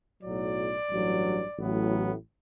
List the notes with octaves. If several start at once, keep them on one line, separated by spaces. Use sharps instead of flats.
B1 A2 F#3 D5
A1 G2 F#3
A1 A2 F#3 B3